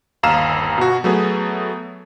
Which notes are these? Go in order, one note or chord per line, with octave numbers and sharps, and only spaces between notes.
G1 D#2 F5 A#5 E6 E7
B2 F#4
F#3 A3 B3 G#4